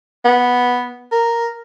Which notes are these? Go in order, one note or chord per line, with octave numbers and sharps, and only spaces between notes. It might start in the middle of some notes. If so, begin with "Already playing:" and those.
B3
A#4